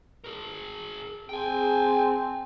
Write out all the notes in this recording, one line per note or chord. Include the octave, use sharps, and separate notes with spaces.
G#4 A#4
C4 G#4 G5 G#5